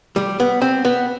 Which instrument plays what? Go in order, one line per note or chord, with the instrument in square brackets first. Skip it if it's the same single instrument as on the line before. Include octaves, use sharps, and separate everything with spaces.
[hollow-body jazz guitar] G3
B3
C4
B3